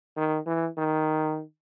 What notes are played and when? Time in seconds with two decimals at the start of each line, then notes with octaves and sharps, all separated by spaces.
0.17 D#3
0.46 E3
0.78 D#3